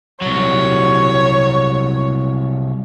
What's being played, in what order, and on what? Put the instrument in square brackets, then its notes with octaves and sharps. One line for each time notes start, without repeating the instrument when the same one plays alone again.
[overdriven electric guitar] C2 F#3 [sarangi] C#5